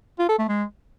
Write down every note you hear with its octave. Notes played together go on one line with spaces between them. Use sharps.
F4
A4
A3
G#3